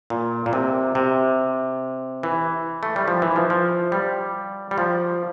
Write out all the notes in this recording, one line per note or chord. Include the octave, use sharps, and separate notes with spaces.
A#2
A#2
C3
C3
E3
A3
G3
F3
E3
F3
F3
G3
G3
F3